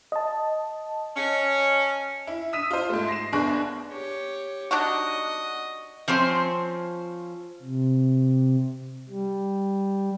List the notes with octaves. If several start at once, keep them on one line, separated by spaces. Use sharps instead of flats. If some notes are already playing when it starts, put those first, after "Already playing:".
D#5 A5
C#4
E4
D#6 E6 B6 D#7 E7
F4 C5
G#2 A3
A#6 C7 E7
F#1 B3 D4 G#4 C#6 F#6
G4 C#5
D4 D#4 F#4 D#5
F3 C4 C#4 C5
C3
G3